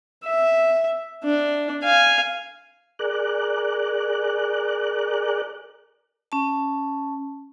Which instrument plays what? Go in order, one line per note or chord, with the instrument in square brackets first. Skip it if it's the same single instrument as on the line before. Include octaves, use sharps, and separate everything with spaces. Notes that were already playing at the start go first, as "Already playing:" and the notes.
[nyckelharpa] E5
D4
F5 G#5
[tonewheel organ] G#4 A#4 D5 F#6
[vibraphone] C#4 A5